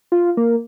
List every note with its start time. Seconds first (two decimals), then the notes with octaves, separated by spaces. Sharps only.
0.12 F4
0.37 A#3